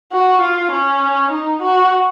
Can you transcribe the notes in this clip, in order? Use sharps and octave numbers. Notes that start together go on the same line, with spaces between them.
F#4
F4
C#4
D#4
F#4